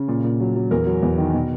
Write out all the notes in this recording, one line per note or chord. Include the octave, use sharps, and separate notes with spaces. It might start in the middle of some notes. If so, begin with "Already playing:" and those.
Already playing: C#3
A#2
A#2
F#3
F#3
E2 A#4
F#3
E2
D#3
B2